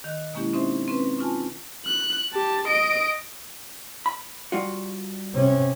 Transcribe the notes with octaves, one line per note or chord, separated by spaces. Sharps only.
D#3 D#5 F#6
B2 G#3 A#3 C#4 E4 G4
C4 C#4 D#4 C5 E5
C4 C#4 B4
C#4 D#4 F4 G#5 A5
F#6
G4 A5
D#5 D7
B5
G3 F4 F#4
C3 C#4